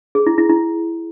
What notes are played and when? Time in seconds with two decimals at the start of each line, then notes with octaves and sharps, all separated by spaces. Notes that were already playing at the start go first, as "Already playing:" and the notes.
0.15 G#4
0.27 E4
0.38 E4
0.49 E4